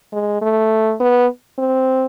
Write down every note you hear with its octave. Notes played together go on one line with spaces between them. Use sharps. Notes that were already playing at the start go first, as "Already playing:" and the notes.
G#3
A3
B3
C4